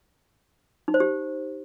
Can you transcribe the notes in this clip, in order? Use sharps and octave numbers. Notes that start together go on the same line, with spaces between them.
D#4
C5
G4